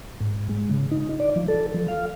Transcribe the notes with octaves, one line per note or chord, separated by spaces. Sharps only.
G#2
G#3
C#3
D#4
D5
F3
A4
F3
F5